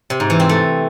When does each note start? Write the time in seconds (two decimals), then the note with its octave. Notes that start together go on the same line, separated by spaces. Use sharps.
0.10 C3
0.20 G#2
0.30 E3
0.40 C4
0.49 A3